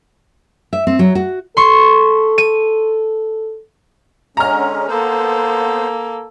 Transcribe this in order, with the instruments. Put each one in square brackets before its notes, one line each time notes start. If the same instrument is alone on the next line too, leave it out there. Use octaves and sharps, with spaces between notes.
[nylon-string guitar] E5
C4
F#3
F#4
[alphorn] A4 [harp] C6 C#6
[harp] D#7
[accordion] D3 G#3 C#4 [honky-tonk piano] A#5 F6
[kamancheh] A#3 A4 [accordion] B3 C5